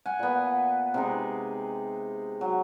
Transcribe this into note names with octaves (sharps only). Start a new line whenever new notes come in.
F#5 G#5
A#2 B3
C3 G#3 D#4
F#3